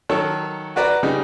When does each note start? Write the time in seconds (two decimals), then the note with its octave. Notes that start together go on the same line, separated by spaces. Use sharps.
0.09 D#3 F#3 A4 C#5
0.76 F#4 B4 D5 A#5
1.03 C#3 G3 D#4